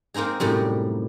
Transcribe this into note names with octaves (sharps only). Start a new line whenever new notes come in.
G#3 A#3 C4 D#4 G#4
F#2 A2 C3 G3